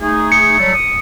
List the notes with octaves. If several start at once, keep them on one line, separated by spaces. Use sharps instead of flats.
A3 D#4 G#4
C#7
F#3 G3 A3
D#6